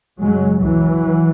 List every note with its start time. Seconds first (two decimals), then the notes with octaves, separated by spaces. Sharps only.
0.20 F#2 C#3 F#3 G#3
0.61 C#2 B2 E3 F#3